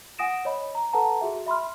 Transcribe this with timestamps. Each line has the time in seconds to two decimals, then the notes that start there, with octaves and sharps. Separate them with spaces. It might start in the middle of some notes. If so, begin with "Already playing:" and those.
0.19 F#5 G#5 D#6 A#6 D7 E7
0.45 C#5 D#5 B5
0.75 A#5
0.93 A4 B4 F#5 A5 A#5
1.21 F#4 G#4 E5
1.46 E5 B5 C6 F6